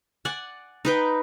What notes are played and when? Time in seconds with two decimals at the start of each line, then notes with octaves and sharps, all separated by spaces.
0.25 D5 F#5 G#5
0.85 D#4 B4 G5